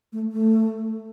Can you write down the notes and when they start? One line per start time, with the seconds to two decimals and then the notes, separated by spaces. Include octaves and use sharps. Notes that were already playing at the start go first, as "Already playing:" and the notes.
0.13 A3
0.32 A3